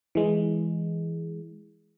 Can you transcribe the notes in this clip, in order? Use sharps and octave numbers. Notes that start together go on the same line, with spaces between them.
E3 G#3